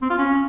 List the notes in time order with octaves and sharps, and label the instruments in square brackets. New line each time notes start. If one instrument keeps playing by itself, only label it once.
[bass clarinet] C4
F4
C#4